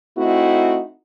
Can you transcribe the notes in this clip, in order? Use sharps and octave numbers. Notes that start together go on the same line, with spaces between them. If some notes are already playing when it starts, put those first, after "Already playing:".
A3 C4 D#4 E4 F#4